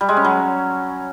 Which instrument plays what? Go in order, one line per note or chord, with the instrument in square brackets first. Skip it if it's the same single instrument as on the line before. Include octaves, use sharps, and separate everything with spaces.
[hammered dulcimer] G3
G#3
C#4
F#3